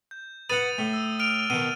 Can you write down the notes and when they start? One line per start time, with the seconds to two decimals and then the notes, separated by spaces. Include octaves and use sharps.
0.11 G6
0.50 B4 F#5 D#6 A6 D#7
0.78 A2
0.93 E6
1.19 F6 D7 F7
1.50 B2 D#3 D#7